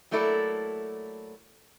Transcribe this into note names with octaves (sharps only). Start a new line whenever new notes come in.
F#3 A3 A#3 E4 A4 D5